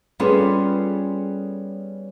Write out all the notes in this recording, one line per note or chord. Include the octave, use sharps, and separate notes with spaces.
G3 B3 C#4 F4 G#4 A4